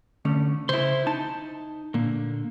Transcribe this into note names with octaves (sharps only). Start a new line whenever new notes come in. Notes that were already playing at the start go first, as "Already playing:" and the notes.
D3 A3 C#4
C#3 E4 C5 C6
D#4 A5
A#2 D3 A#3